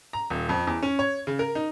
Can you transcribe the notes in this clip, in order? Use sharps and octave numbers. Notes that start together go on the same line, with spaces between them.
A#5
D#1
F2
E2
C#4
C#5
C#3
A#4
D#4